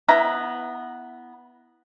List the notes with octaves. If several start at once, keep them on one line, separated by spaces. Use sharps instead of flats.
B3 E4 A#5